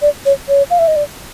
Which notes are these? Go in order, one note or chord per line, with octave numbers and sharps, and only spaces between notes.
D5
C#5
C#5
F5
E5
D#5
D5